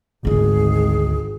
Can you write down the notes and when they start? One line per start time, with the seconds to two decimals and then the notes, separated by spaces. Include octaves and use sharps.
0.25 G#1 D2 E4 G#4